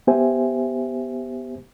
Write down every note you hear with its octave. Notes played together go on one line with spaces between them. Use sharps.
B3 G4 C5 E5 G#5